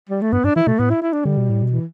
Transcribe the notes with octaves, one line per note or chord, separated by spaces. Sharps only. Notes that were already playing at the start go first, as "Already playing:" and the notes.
G3
A3
G2 B3
G2 D4
E3 E4
B2 A3
A2 B3
E4
E4
D4
D3 G3
B2
A2
B2
E3